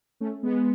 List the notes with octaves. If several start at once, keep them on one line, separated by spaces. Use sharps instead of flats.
A3 C#4
G#3 B3